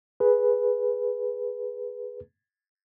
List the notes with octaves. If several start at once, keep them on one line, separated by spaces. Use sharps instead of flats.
G#4 B4